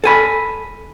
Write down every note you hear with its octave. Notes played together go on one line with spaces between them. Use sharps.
A4 G#5 B5